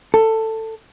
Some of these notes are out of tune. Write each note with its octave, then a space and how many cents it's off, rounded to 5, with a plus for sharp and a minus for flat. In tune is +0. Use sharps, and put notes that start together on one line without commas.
A4 +15